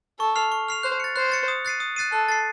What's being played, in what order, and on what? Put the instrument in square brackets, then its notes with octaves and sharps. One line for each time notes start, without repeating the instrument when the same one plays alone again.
[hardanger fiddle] A4 [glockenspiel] C#6
[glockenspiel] F6 C7 F7
C#6
F6 C7 F7
[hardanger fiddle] C5 [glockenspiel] F#6
[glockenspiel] A6 C#7
[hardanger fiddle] C5 [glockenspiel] F#6
[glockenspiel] A6 C#7
D#6
F#6 A6 C7 D#7
D#6
F#6 A6 C7 D#7
[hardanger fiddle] A4 [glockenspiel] F#6
[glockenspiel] A6 C7